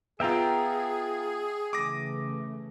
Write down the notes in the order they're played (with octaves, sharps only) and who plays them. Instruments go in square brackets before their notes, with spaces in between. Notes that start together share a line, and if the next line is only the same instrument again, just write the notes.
[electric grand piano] B3 F4 [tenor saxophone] G#4 [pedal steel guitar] E5 G5 A#5
[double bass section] C#3 E3 A3 [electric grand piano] D6 D#6 A#6